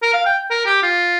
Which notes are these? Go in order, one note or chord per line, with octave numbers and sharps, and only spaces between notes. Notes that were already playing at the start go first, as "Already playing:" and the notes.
A#4
F5
G5
A#4
G4
F4